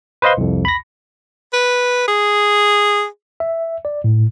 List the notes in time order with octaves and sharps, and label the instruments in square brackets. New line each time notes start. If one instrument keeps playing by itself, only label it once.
[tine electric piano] B4 C5 D#5 F5 C6
C2 F2
B5 A#6
[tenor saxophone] B4
G#4
[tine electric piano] E5
D5
A2